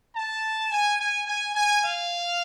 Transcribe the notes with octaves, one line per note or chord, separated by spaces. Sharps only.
A5
G#5
G#5
G#5
G#5
F5